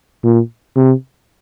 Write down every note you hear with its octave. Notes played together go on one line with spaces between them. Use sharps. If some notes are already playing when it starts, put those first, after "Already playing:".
A#2
C3